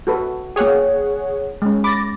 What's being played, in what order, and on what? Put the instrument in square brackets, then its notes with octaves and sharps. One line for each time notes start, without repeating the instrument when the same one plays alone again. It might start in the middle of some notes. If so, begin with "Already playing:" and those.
[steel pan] F#4 A4 B4
[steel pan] A#3 G5 [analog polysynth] G#4 C#5 F#5
[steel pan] G#3 C#4
[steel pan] B5 [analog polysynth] D6 A6 A#6